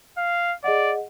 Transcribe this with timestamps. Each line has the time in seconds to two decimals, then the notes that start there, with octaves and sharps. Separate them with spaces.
0.18 F5
0.64 G#4 D5 D#5 F#5